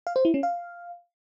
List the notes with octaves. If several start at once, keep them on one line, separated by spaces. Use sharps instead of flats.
F5
C5
E4
C#4
F5